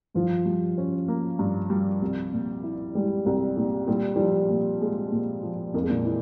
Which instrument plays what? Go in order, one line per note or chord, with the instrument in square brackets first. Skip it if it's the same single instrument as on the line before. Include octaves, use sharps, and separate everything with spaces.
[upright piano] G2 [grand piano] F3 F4
[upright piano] G3
C#4
A#3
G2
G3
C2
A#2
E4
[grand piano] G3 [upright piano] G#3
[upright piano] C2 [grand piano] G3
[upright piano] A#2 [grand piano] G3
[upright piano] A#2 [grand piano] G3
[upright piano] F3 [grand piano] G3
[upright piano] A#2
[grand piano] G#3 [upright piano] A#3
[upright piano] A#2
F3
[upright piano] F2 [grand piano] A#3
[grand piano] G#3
A#2 A#3
[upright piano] E3